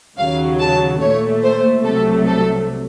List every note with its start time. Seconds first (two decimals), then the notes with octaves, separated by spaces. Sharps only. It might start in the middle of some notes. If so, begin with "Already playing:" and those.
0.17 D#2 C#3 F#3 F5
0.59 A5
1.01 A#2 A3 C#5
1.43 C5
1.84 C2 C3 F#3 A3 A4
2.27 A4